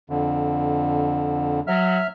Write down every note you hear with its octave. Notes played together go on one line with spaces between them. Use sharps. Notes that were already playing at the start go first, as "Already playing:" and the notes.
F2 D3
F#3 E5 F6